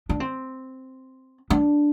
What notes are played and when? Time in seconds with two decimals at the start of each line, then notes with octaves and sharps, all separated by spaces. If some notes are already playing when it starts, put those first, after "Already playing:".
0.09 D4
0.20 C4
1.50 D4